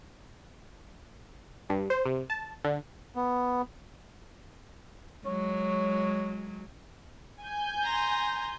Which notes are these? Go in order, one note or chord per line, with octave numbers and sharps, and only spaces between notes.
G2
C5
C3
A5
D3
B3
F#3 G#3 C#5
G#5 G6
A#5 C6